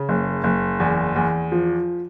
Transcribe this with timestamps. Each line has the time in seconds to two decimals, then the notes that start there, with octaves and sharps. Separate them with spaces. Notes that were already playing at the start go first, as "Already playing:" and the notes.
Already playing: C#3
0.09 F#1
0.44 F#1
0.80 E2
1.16 E2
1.52 F3